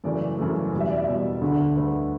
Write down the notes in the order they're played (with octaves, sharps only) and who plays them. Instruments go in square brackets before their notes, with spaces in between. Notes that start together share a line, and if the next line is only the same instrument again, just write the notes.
[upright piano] F#2 C#3 E3 A3 D5
F#2 C#3 E3 A3
E2 B2 G3
E5
D5
E5
E2 B2 G3 D5
D2 D3 A3
D2 D3 A3 B4